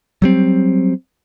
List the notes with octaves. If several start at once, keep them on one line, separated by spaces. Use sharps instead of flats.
F#3 G3 C4